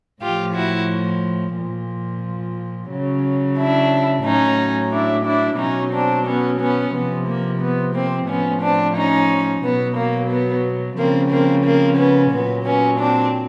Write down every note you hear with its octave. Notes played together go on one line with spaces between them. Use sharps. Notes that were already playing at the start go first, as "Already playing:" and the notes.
A2 F3 F4 G4
E4 F#4
A#2 F3
C#3 F#3
D4 E4
A2 F#3 C#4 D#4
D4 E4
D4 E4
B2 F#3 C#4 D#4
C4 D4
B3 C#4
B3 C#4
C3 F3 B3
A#3
B3
A#3 C4
A2 F3 B3 C#4
C4 D4
C#4 D#4
B2 F#3 B3
A#3
B3
C#3 F3 A#3 C4
A#3 C4
A#3 C4
B3 C#4
A#2 F#3 B3
B3 C#4
C4 D4